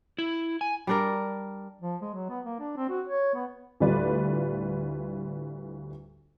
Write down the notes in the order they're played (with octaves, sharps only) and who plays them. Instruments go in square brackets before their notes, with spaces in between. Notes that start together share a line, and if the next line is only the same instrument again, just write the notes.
[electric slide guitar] E4
G#5
[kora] G3 D4 A#4
[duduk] F3
G#3
F#3
B3
A#3
D4
C4
F#4
C#5
B3
[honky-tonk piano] D2 A2 G3 F4 B4 D5